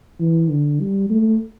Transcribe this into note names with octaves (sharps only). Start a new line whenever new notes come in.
E3
D3
G3
A3